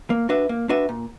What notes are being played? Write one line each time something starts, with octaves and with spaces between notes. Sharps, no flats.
A#3
D4 F#4 B4 E5
A#3
D4 F#4 B4 E5
A#2